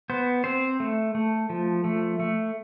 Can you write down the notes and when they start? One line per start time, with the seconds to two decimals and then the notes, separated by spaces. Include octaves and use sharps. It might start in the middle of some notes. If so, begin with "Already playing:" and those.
0.10 B3 C5
0.44 C4 C5
0.80 A3
1.15 A3
1.50 F3
1.84 A3
2.20 A3